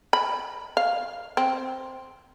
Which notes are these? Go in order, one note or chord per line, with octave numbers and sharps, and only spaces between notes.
B5
F5
C4